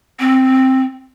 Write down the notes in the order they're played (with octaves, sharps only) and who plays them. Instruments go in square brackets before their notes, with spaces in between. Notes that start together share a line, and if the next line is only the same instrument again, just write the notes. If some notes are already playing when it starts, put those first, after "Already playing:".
[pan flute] C4